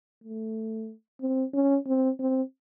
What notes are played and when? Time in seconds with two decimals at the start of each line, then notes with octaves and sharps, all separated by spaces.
0.24 A3
1.21 C4
1.54 C#4
1.87 C4
2.19 C4